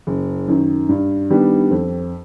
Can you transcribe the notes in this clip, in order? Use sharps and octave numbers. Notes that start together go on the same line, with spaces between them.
F#1
F#2 D#3
G2
D#3 G3 B3 D4
F2